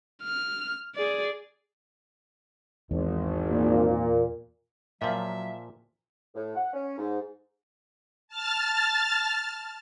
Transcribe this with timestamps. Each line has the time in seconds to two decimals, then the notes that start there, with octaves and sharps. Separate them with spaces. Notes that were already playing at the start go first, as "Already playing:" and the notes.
0.23 F6
0.95 G#4 D5
2.91 G#1 E2
3.50 A#2
5.02 A#2 F3 F#3 E5
6.35 A2
6.56 F#5
6.73 C#4
6.98 G#2
8.28 A5 F6 A6